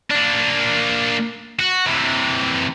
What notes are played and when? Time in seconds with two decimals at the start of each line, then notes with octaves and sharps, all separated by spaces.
0.11 A#3 D4
1.59 F#4
1.86 C3 E3